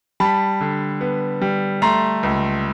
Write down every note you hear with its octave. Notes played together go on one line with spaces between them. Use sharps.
G3 A5 B5
D3
B3
G3
A3 A#5 C6
C#2